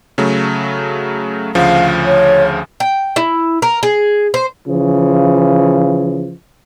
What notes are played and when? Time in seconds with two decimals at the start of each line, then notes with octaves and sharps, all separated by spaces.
0.18 C#3 F#3 A3
1.55 D2 C#3 F3 F5
2.06 C#5
2.80 G5
3.16 E4
3.62 A#4
3.83 G#4
4.34 C5
4.66 C#3 E3 F3